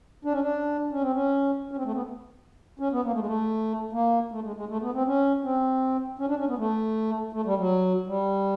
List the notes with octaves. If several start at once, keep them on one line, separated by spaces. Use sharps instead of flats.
D4
C#4
D4
C#4
C4
C#4
C#4
C4
A3
C4
B3
C#4
B3
A#3
A3
G#3
A3
A#3
A3
G#3
G#3
A3
B3
C4
C#4
C4
C#4
D4
C#4
B3
A3
A3
G3
F#3
G3